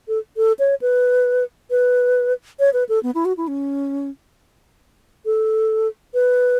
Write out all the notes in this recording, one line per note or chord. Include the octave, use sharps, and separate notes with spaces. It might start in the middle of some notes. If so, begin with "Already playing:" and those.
A4
A4
C#5
B4
B4
C#5
B4
A4
B3
E4
F#4
E4
C#4
A4
B4